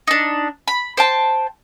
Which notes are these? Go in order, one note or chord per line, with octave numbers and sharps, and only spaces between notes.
D4 D#4
B5
C5 G5 A5